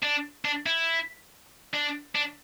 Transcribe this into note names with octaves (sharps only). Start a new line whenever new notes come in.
D4
D4
E4
D4
D4